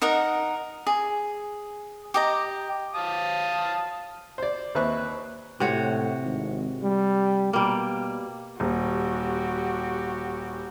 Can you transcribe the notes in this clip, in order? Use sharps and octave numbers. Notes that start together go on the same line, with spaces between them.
D#4 A#4 D#5 F#5
G#4
G4 D#5 A#5
F5 A5 D#6
C5 D5
D#2 C4 B4 E5 C#6 F#6
A2 C3 F#4 C#5
G#1
G3
B2 G3 A#3
D#1 F#4 G4